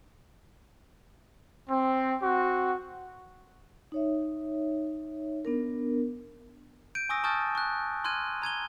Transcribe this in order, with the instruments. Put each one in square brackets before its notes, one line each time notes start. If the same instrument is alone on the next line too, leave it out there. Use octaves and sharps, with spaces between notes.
[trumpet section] C4
C4 F#4
[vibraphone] D#4 C#5 E5
B3 D4 A#4
[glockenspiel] G6 D7 D#7
G#5 C#6 D#6 E6 A#6
A5 C#6 D#6 F6 G6 A6
C#6 F#6
C6 F6 F#6 G#6 D#7
A#5 G#6 D#7 G7